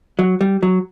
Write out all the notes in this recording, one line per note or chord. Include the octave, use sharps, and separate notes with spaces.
F#3
G3
F#3